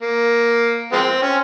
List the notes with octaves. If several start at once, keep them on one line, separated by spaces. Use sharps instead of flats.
A#3
F3 G#3 C4
C#4